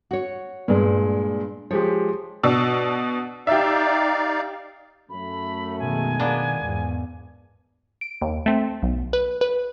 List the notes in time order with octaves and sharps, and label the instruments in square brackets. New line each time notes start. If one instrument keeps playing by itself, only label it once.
[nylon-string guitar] F#4 C#5
[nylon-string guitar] G2 [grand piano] A#2 G#3
[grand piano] F3 G#3 G4 [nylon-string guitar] C#5
[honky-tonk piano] B2 D4 E6
[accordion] D#4 D5 F5 [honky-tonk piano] G4 E5
[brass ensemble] F#2 A3 [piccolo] B5
[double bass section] B2 D#3 G#3 [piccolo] G#5
[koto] A#3 B3 D4
[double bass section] E2 G#2
[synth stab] D7
D#2
A3 C4
B1
B4
B4